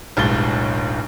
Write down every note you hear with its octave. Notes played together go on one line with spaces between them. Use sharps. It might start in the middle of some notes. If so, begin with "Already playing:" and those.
D1 B1 G2 G#3 A6 G7